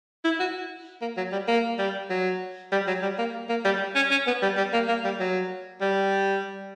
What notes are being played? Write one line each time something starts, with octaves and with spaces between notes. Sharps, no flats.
E4
F#4
A#3
F#3
G3
A#3
G3
F#3
G3
F#3
G3
A#3
A#3
G3
C#4
C#4
B3
G3
G3
A#3
A#3
G3
F#3
G3